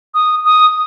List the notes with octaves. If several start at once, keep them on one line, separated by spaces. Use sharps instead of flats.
D#6
D#6